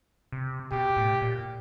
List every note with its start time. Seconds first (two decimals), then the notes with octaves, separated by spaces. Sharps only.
0.32 C3
0.71 B2 G4
0.97 A2
1.22 A#2